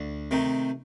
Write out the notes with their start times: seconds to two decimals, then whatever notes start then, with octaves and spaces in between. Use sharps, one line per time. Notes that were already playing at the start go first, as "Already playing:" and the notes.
Already playing: D2
0.31 C3 D#3 A3 D#4